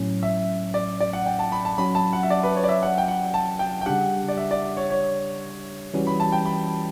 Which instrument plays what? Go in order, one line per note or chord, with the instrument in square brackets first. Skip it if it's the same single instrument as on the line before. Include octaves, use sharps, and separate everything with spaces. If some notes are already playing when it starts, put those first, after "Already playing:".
Already playing: [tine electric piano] A2 F#3 C#4
[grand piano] E5
D5
D5
F#5
G5
A5
B5
A5
[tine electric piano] F#3 C#4 F#4 [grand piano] B5
[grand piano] A5
F#5
E5
D5
B4
C#5
D5
E5
F#5
G5
F#5
A5
G5
G5
[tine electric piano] C#3 G3 D4 G4 [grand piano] F#5
[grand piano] D5
E5
D5
C#5
C#5
[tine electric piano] E3 G3 C#4 F#4
[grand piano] B5
A5
G5
B5